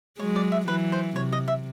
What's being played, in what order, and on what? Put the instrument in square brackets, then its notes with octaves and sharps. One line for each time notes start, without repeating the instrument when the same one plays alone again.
[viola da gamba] F#3 G#3 [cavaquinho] C#5
[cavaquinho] D5
E5
[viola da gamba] E3 F#3 [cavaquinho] B4
[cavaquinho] C5
[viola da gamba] C3 [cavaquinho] C#5
[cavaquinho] D#5
E5